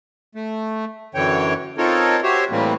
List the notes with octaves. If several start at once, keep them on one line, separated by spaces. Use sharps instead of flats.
A3
F#2 D3 E3 C#5 G5
C4 D#4 F4 A4 A#4 C#5
F#4 G4 C5 C#5 E5
A2 E3 G3 A3 A#3 C4